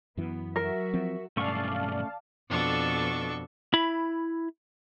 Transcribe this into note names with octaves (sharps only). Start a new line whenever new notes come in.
F#2 E3 B3
F#3 F#4 A#4 E5
F3 C4
B1 G2 A3 C#4 D5 F5 A5 C#6
F2 B2 D4 A4 C#6
E4 B5